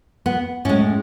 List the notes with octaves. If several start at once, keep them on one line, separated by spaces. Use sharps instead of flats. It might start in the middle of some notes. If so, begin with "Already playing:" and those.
B3
A2 G#3 C#4